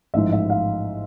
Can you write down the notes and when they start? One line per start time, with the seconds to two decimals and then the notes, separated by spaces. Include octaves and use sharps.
0.14 A1 G#2 F3 E5
0.32 E5
0.50 F5